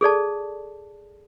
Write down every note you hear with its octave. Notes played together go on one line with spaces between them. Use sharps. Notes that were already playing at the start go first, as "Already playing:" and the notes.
G#4 A4 D5 A5